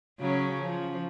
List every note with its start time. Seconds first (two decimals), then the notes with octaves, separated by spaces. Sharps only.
0.20 C#3 F#3 C#4
0.62 F3